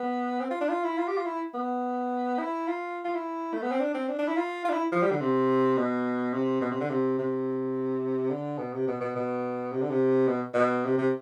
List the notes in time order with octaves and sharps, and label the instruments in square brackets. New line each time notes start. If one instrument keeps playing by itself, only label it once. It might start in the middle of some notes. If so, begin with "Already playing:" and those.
Already playing: [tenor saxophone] B3
C4
F4
D4
F4
E4
F4
G4
F4
E4
B3
E4
F4
F4
E4
A3
B3
C4
D4
C4
D4
D4
E4
F4
F4
D4
E4
F3
G3
D3
C3
B2
C3
B2
C3
D3
C3
C3
D3
B2
C3
B2
B2
B2
C3
D3
C3
B2
B2
C3
C3